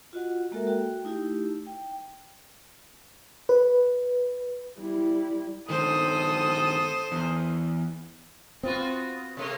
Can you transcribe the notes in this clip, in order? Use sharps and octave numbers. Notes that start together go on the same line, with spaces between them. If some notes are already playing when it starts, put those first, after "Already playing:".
F4 F#4 D#5 F#5
G#3 A#3 F#4 A4 A#4 E5
F#4 G5
A3 D#4 E4 G4
G5
B4
G3 E4
G2 D#3 A4 C5 D#6
E2
B3 C4 F4 F#4
C3 A3 A#3